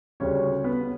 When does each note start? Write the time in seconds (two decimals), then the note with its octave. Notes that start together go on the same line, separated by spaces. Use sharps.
0.20 D2 C#3 G3 C#4 C#5
0.64 B3 B4